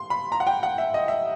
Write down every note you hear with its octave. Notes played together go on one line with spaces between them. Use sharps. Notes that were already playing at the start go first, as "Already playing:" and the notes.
Already playing: C6
B5
A#5
F#5
G5
F#5
E5
D#5
E5